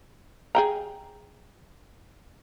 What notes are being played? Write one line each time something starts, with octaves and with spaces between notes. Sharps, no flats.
G#4 G5 A#5